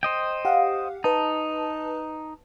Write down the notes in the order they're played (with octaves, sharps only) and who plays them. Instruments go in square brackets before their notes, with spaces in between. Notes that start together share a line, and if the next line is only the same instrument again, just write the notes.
[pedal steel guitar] C5 D#5 G5
[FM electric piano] G4 F5 F#5
[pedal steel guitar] D#4 [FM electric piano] B4 A5